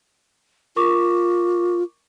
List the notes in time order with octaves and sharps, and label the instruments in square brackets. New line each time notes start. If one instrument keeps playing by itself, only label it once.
[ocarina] F4 [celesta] A#4 C#6 D6